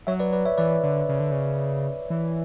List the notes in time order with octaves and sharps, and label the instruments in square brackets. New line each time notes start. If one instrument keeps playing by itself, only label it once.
[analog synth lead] F#3 [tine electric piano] C#5 E5
[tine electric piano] B4 D5
B4 D5
C#5 E5
[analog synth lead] E3 [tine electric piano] B4 D5
[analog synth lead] D3
C#3
D3
C#3
E3